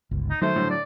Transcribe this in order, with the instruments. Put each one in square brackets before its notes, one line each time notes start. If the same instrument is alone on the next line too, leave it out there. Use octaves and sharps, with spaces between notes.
[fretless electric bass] G1 C#2
[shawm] D#4
[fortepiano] D#3 A3 [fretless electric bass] F#3 [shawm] C5
[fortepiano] A2 D3
[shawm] D5